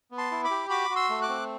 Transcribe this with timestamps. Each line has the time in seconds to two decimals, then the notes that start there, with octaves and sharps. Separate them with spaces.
0.11 B3
0.18 A5 C6
0.31 E4
0.44 B5 D6
0.51 G4
0.70 F#4 B5 D6
0.90 F#4
0.96 C6 E6
1.09 A3
1.22 D6 F#6
1.28 C4